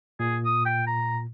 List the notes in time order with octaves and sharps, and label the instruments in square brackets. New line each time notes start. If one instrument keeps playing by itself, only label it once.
[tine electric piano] A#2 [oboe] G#4
[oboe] D#6
G5
A#5